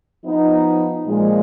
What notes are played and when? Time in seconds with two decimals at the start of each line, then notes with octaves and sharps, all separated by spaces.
0.23 F3 B3 D#4
1.06 A#2 F3 G#3